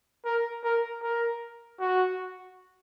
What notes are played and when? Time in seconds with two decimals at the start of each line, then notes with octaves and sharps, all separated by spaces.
0.25 A#4
0.63 A#4
1.02 A#4
1.79 F#4